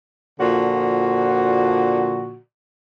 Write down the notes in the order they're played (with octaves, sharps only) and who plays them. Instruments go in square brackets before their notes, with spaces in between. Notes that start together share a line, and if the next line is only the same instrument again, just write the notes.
[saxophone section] A#2 D3 F3 F#4